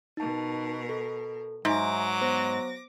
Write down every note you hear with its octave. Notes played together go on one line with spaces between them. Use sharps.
B2 D#4 A#4 A5
A4
G#2 F#3 E5 G#5 D6 A#6
B3 C5